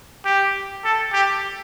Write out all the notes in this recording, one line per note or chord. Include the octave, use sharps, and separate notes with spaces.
G4
A4
G4